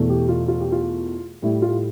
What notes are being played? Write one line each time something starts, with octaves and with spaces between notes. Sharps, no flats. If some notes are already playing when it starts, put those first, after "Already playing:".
Already playing: E2 B2 A3
G4
F4
F4
G4
F4
A2 G3 E4
F4